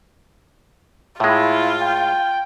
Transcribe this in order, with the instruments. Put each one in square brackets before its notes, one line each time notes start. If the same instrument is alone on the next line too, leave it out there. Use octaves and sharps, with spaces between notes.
[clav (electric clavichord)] A2 G#3 [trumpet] E4 [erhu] F4
[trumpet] G5